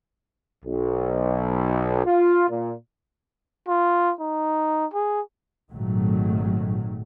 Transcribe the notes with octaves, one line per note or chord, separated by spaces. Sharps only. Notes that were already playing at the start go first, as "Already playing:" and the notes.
B1
F4
A#2
F4
D#4
G#4
G#1 A#2 D#3 F#3 A3